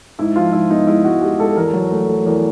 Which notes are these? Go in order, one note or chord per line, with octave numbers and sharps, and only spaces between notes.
G#2 E4
F3 F4
G#2 E4
B3 D#4
G#3 E4
G#2 F#4
G#3 G4
G#3 A4
E2 A#4
F#3
A3
A3
E2 A#4